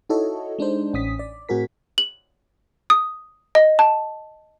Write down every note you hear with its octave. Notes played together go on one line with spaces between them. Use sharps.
D#4 E4 F#4 A4 C#5 D#5
G#3 D4 D#4 C5
A1 C#4 D#6 B6
D5
A2 C4 F#4 G#4 A#4 B6
F#7
D#6
D#5
A5